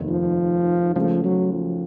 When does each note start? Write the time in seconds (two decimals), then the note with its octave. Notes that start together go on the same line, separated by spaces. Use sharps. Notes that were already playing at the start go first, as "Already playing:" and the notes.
Already playing: F1 D#2 D#3
0.09 F3
0.95 C#2 C#3 F3 A3
1.24 F#3
1.53 F3